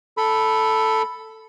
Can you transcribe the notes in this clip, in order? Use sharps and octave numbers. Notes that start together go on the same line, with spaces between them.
A4 B5